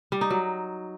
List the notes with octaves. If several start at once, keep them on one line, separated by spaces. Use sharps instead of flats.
G3
D#4
F#3